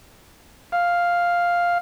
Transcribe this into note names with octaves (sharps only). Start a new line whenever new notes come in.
F5